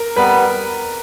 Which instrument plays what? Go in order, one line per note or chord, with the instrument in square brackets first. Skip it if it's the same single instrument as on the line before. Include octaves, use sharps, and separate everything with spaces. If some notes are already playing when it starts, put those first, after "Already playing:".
Already playing: [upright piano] A#4
[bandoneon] G3 B3 [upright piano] B4